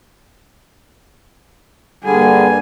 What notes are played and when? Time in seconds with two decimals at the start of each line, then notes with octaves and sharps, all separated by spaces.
2.04 G2 D3 G3 A#3 G#4 G#5